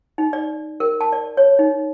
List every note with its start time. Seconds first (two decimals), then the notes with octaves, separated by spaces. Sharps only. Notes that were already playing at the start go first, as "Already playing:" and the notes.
0.18 D#4
0.33 D5
0.80 A#4
1.01 A5
1.12 D5
1.37 C#5
1.59 D#4